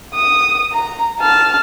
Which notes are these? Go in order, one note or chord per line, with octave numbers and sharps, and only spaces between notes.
D#6
A#5
A5 F6